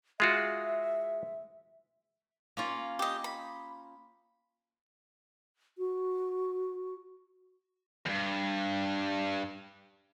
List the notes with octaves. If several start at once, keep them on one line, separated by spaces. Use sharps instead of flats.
G#3 F4 F#4 E5
A#3 C#4 F4
G4 D#5
B5
F#4
E2 G2